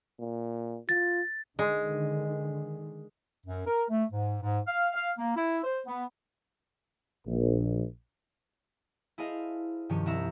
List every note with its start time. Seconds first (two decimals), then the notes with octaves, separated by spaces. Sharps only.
0.20 A#2
0.89 F4 A6
1.59 D3 D#3 G#3
3.45 F#2
3.67 A#4
3.88 A3
4.11 G#2
4.41 G#2
4.67 F5
4.95 F5
5.17 A#3
5.36 E4
5.64 C5
5.86 B3
7.26 A#1
9.18 E4 G#4 A4 C5 D#5 F5
9.89 G2 C3 D#3 F3 C#4 G4
10.06 C2 C4 E4 E5 A#5 E6